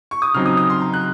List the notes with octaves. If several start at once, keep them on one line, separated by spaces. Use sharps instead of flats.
C#6
D#6
C#3 F#3 C4 D#4 F6
D#6
D#6
C6
A#5
F#6